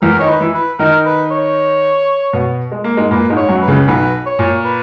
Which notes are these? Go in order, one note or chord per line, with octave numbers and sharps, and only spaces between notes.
E2 E3 A#4
D#3 D#4 C#5
B4
E3 E4
B4
D#3 D#4 A#4
B4
C#5
B2 B3
G#3
A#3
G#2 G#3
A#2 A#3 B4
G#2 G#3
C#5
F#2 F#3
B4
C#2 C#3
B1 B2 B4
C#5
A#2
B4